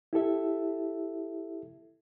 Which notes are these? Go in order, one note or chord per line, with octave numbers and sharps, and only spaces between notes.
E4 G4 A4 E5